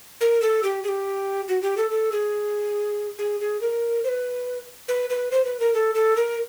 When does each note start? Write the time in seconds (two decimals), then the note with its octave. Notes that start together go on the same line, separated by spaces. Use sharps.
0.21 A#4
0.42 A4
0.63 G4
0.84 G#4
0.88 G4
1.48 F#4
1.62 G4
1.77 A4
1.91 A4
2.12 G#4
3.19 G#4
3.40 G#4
3.61 A#4
4.04 C5
4.09 B4
4.88 B4
5.10 B4
5.32 C5
5.45 B4
5.60 A#4
5.74 A4
5.95 A4
6.17 A#4